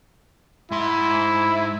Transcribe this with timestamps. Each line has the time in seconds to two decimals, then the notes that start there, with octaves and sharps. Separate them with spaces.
0.71 G#2 E4 C6